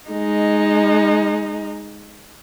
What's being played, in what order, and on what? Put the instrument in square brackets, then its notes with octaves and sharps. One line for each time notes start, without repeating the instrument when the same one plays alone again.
[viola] G#3 D#4